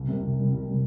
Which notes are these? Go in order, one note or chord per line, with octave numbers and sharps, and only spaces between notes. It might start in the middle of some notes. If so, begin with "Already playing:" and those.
Already playing: C2
C3 G3 A#3
C2
C3 G3 A#3
C2
C3 G3 A#3